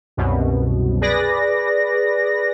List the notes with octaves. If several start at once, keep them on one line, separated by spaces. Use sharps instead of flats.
C2 F#2 B2
G#4 B4 D5 A#6